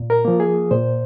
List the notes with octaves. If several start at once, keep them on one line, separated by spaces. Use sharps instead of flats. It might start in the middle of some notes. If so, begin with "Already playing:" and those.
Already playing: A#2
A#4
F3 A#3
G#4
A#2 C5